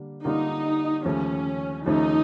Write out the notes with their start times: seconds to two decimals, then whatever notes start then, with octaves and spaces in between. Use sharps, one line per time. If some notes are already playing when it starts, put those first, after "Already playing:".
Already playing: D3 G3 A#3 D4
0.25 D3 G3 A#3 D4 D#4 F4
1.05 D#2 C#3 F3 A3 C#4
1.85 D#2 C#3 F3 A3 D#4